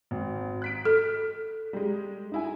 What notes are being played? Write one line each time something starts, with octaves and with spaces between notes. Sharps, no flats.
G#1
F#6 B6 D7
A4
G3 G#3
D#4 E4 G#5